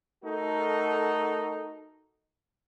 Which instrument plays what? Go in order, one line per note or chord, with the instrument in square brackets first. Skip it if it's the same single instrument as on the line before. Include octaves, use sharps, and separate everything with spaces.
[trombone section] A3 D#4 F#4 A4 A#4